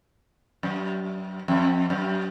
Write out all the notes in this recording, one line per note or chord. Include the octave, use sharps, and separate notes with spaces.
F#2
F2
F#2